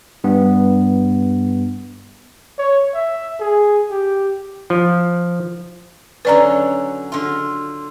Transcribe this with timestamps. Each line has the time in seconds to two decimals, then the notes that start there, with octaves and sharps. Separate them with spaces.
0.24 G2 B3
2.58 C#5
2.94 E5
3.40 G#4
3.90 G4
4.70 F3
6.25 D3 F#3 C#4 B4 D5 A#5
7.12 D3 F4